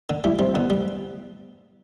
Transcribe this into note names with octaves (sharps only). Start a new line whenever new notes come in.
D3
G3 E4
G3 C4
D3 B3
G3